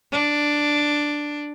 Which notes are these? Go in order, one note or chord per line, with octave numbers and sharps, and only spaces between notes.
D4